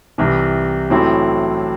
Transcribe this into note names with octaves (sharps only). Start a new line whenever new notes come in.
C2 C3 E3
A1 A2 F#3 C4 E4